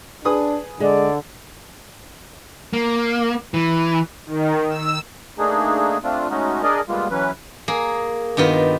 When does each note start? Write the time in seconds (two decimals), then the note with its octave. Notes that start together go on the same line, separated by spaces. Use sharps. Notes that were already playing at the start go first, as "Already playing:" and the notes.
0.25 D4 G#4 B4 D#6
0.80 D3 G#3 D5
2.73 A#3
3.54 E3
4.26 D#3
4.69 E6
5.38 A3 A#3 D4 D#4 G#4
6.04 A3 C4 D4 F4
6.30 G#3 A3 C#4 D#4 F#4
6.63 D4 G#4 A#4 D5 D#5
6.89 G3 G#3 A#3 B3 F4
7.11 E3 F#3 C#4 B4
7.68 A#3 G#4
8.37 G2 D#3 B3 F4